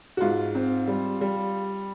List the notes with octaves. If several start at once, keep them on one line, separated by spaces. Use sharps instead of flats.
F#4
G#2 F4
C4
G3
G3